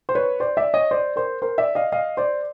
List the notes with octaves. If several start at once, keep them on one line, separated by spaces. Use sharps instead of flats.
C5
B4 C#5
C5 D5
D5 E5
C#5 D#5
C5 D5
A#4 C5
A#4 C5
D5 E5
D#5 F5
D#5 F5
C5 D5